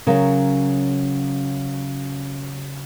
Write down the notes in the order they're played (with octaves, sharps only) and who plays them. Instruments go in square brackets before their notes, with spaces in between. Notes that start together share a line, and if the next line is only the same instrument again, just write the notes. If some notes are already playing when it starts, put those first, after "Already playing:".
[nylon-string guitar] C#3 F#3 C#4 A#4